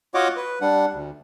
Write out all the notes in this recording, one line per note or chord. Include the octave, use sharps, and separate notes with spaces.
F4 F#4 C#5 D#5 F#5 D6
B4
G3 D4 F#5
D2